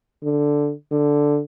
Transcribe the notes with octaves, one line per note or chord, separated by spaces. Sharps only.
D3
D3